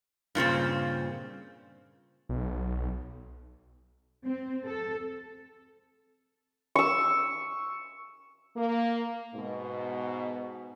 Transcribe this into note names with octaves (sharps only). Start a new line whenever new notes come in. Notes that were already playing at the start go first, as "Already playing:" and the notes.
G2 A#2 C#3 C4
B1
C4
A4
C#6 E6
A#3
G#2 B2